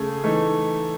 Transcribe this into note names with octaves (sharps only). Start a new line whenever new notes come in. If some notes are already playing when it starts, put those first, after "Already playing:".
Already playing: C#3 A3 G#4
E3 A3 D#4